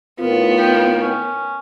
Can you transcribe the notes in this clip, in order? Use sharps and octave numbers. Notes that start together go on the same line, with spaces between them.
A2 D#3 B3 F4
G5
C#4